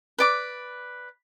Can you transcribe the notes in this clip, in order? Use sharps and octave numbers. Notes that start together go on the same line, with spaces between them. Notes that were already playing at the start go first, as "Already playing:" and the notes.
B4 D5 D6